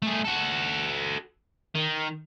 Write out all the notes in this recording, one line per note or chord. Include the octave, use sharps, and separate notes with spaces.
A3 G#4
F#4 A4
D#3